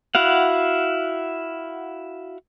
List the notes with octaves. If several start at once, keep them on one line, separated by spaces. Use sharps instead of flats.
E4 F#4 F5 F#5